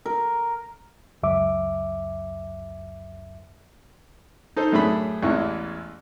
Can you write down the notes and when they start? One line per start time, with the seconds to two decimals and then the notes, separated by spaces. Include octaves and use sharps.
0.06 A#4
1.23 C#2 F#2 E5 D6
4.56 D#4 A4 C5
4.72 F#2 A2 A3 D4 G#4 B5
5.22 A1 E2 E3 G#3 E4 C#6